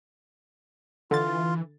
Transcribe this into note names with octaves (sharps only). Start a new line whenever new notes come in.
D3 E3 F4 A6